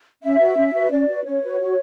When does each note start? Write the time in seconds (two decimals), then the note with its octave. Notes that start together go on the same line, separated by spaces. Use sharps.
0.22 C#4 E5
0.39 F#4 B4
0.56 C#4
0.73 F#4 B4
0.91 C#4 D5
1.08 F#4 B4
1.25 C#4 C#5
1.42 F#4 B4
1.60 F#4